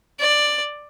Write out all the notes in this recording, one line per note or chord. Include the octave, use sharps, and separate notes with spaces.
D5